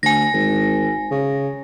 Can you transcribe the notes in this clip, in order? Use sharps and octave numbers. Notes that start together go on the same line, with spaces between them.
D2 G#5 A#6
G#1
C#3